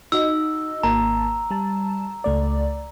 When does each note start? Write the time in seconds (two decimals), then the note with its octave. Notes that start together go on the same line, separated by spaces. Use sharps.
0.12 D#4 F#4 D#5 E6
0.83 G#1 A#3 A5 A#5
1.51 G3 A5
2.24 C#2 A3 D5